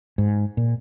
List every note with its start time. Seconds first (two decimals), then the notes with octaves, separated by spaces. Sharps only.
0.18 G#2
0.57 A#2